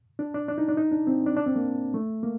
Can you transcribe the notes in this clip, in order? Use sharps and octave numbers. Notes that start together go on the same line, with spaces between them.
D4
D4
D4
D#4
D4
D#4
D4
C4
D4
D4
C4
A#3
A3
A#3